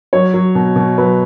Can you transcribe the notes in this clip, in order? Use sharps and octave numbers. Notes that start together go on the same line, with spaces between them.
F#3 C#5
F#3
B2
B2
F#3 B4